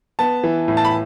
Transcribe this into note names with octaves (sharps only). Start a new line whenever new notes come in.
B3 A5
E3
A2
A5
B5